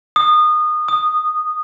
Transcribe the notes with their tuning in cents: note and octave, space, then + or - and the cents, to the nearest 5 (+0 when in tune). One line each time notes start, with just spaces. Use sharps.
D#6 -25
D#6 -10